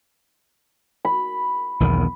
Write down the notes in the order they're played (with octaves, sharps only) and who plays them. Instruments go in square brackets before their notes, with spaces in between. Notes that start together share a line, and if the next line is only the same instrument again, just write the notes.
[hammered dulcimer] B5
[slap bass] B1 E2 D#3